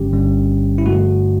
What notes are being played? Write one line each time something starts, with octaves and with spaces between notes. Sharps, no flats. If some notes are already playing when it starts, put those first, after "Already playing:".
Already playing: G1 G2 D3 G3 C#4 G4
G1 G2 D3 G3 C#4
E4
G2 D3 A3 F#4